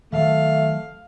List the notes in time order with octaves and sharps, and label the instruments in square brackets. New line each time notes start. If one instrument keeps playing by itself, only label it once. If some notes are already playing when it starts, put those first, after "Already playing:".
[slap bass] D#3 F#3 [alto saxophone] A3 [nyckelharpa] F5